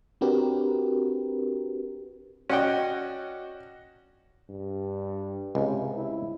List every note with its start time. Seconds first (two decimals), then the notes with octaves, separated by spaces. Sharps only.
0.21 C4 D4 F#4 G4 A#4 B4
2.50 C#4 F#4 D5 D#5 F#5 G5
4.49 G2
5.55 C#2 C3
5.96 E4